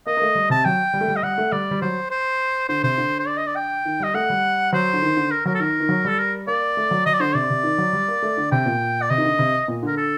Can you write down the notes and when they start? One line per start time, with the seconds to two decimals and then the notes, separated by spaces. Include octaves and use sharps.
0.06 A#3 D#5
0.17 A#3
0.22 A3
0.35 G3
0.50 C3 A5
0.65 F#3 G5
0.94 G3
1.01 A3
1.08 G3
1.16 D#5
1.23 G3 F#5
1.38 A3
1.52 G3 D5
1.71 G3
1.81 F#3 C5
2.11 C5
2.69 D3 C5
2.83 C3 C5
2.98 D3
3.19 C5
3.27 D5
3.37 D#5
3.47 D5
3.56 G5
3.85 D#3
4.00 G3 D#5
4.14 A3 F#5
4.30 G3
4.73 F#3 C5
4.93 D3
5.03 D#3
5.17 D3
5.31 A#4
5.46 F#3 A#4
5.54 A4
5.60 D#3 A#4
5.80 D#3
5.89 F#3
6.05 G3 A4
6.19 A#4
6.47 A#3 D5
6.77 A3
6.91 F#3
7.06 F#3 D#5
7.13 D5
7.20 D3 C5
7.35 C3 D5
7.50 C3
7.64 D#3
7.78 F#3
7.93 G3
8.08 A#3
8.22 A3
8.37 D3
8.51 C3 G5
8.66 A#2
9.02 D5
9.10 C3 D#5
9.18 D#3
9.24 D3
9.39 C3
9.68 A#2
9.83 D3 A#4
9.97 A4